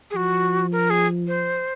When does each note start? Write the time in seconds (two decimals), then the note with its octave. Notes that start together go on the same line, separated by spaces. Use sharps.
0.11 G#4
0.15 F3 F#4
0.72 A#4
0.90 G#4
1.28 C5